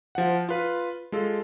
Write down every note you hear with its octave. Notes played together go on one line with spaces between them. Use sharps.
F3 F#5
F4 B4
G#3 F4 A4